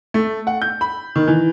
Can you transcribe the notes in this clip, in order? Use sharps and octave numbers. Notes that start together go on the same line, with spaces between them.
A3
F#5
G6
B5
D#3
E3